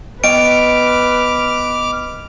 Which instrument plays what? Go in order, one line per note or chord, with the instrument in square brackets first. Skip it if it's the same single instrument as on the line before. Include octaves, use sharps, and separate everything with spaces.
[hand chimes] B3 D#5 G5 [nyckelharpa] B4 [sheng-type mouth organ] D6 F6 [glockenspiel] D7